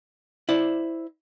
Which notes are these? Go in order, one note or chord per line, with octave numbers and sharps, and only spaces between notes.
E4 C5 D5